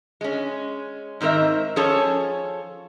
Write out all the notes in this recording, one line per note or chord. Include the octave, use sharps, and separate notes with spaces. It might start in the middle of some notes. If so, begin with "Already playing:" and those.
G#3 C#4
G#2 D#3 C4 A#4 E5
F3 C#4 G#4 A4 C#5 A5